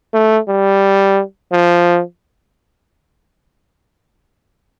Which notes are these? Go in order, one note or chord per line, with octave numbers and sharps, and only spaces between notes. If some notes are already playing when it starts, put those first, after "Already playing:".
A3
G3
F3